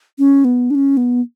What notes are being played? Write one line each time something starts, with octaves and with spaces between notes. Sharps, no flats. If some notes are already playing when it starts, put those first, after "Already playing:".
C#4
B3
D4
C#4
B3